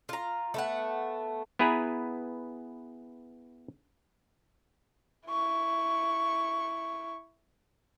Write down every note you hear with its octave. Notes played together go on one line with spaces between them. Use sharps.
F4 A#5
A3 B3 F#5
B3 E4 G#4 B4 G#5 A#5
E4 C#6